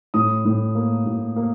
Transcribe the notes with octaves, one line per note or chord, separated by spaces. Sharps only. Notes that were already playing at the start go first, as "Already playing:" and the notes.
A2 D#6
A2
A#3
A2
A#3